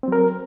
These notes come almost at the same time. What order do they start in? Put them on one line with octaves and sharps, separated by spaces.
C4 F#3 A#4